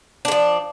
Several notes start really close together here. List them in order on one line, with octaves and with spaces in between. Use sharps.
D4 D3 F3